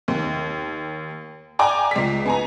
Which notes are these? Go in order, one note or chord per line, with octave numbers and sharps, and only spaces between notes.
D#2
D5 G5 G#5 A#5 D6
C#2 B6
B3 G#5 A#5